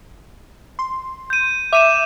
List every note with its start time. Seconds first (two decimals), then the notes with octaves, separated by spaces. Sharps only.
0.79 C6
1.30 G6 D#7
1.73 E5 D6 D#7 E7